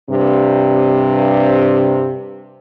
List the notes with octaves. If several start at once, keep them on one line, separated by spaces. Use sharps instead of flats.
G2 C3